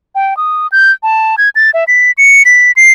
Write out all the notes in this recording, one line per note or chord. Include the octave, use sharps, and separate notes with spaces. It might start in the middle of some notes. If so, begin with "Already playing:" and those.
G5
D#6
G6
A5
G#6
A6
E5
B6
C#7
B6
C7